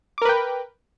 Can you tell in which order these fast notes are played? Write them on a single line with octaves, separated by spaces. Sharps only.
D6 A#4 B4 G5